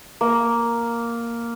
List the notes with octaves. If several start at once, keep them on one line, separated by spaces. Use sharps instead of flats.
A#3